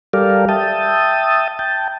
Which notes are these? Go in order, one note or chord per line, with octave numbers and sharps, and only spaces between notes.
G3 G4 A4 A#4 D5 F5
E5 G5 A5 D#6
G5 A5